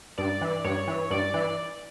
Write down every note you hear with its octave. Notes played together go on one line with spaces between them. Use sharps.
G2 D5
E3
G2 C#5
E3
G2 D5
E3